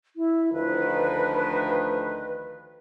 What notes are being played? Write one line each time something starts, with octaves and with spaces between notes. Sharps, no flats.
E4
D2 D#3 F3 B4